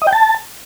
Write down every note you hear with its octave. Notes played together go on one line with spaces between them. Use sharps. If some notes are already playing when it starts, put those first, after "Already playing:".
D#5
G5
A5